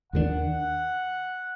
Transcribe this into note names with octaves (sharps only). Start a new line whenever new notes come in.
D#2 D#3 F#3 D4 F#5